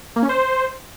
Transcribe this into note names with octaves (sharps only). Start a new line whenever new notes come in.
A#3
C#4
C5